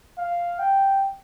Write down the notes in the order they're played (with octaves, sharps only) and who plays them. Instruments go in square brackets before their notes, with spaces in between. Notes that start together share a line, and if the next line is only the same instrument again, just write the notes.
[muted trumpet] F5
G5